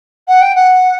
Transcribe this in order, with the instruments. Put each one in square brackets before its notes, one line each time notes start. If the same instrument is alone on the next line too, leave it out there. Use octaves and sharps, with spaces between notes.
[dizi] F#5
G5
F#5